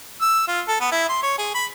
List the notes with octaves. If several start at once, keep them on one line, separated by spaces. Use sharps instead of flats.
E6
F4
A4
B3
E4
C6
C#5
G#4
B5